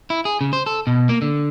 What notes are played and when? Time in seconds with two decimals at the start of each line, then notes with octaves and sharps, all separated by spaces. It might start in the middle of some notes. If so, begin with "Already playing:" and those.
0.10 E4
0.25 G#4
0.41 C#3
0.53 C5
0.66 A4
0.87 B2
1.09 A#3
1.22 D3